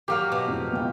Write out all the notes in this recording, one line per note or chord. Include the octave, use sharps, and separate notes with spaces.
F#3 A#3 G4 F5
B2
F2 A2 C#3
F#1 C#2 G5